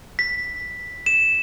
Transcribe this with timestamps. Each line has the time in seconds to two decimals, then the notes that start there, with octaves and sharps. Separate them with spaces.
0.19 B6
1.06 E7